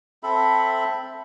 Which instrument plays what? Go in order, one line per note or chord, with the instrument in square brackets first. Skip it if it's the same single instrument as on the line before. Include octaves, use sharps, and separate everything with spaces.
[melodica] C4 A4 E5 B5